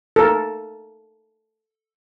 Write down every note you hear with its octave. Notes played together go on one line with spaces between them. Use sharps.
A4 A#4